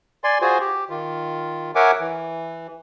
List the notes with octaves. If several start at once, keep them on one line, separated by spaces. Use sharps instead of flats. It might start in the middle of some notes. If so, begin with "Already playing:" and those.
D5 G#5 C6
F4 F#4 G#4 C5 G#5
G4
D#3 F4
A#4 C#5 E5 F#5 G#5 D6
E3